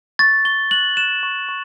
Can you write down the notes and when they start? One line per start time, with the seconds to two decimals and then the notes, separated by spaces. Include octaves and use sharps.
0.19 C#6 A6
0.45 C#6 G7
0.71 F#6 F#7
0.97 F#6 E7
1.23 C#6
1.49 C#6